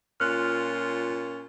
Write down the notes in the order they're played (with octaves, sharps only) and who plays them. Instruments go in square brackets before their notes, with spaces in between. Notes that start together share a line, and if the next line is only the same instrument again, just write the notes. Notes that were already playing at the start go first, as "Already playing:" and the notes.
[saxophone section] A#2 C#4 F4 [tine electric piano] F6 F#6